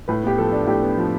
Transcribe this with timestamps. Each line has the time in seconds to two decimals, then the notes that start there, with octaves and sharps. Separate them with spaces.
0.08 A2 B4
0.24 B3 G4
0.38 F3 A4
0.52 D4
0.67 A2 G4
0.82 B3
0.97 F3